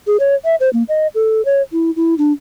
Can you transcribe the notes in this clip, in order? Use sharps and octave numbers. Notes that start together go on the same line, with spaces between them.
G#4
C#5
E5
C5
A#3
D#5
A4
C#5
E4
E4
D4